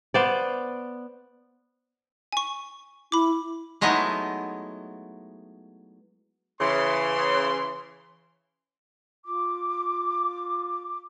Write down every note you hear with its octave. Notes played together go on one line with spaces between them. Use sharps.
B3 C5 D5
G#5 C#6
E4 B5 D6
F#3 G#3 A3 B3 D#4 E4
C#3 E3 C6
F4 D6